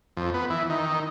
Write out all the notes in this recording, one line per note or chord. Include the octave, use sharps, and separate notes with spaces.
F2
B3
E3
D#3